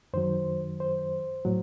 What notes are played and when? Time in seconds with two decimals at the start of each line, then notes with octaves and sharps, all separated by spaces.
0.13 F#2 D#3 F#3 C5
0.80 C5
1.45 A2 F#3